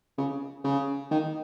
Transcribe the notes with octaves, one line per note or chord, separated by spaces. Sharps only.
C#3
C#3
D#3